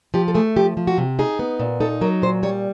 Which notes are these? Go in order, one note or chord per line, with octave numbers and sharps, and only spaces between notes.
F3 G4
A4
A3 G#4
F3 G4
F3
F#4
C3
D#4 G#4
B3
A#2
D#4 A4
F#3 A#4
A#2 C5
G3 C#5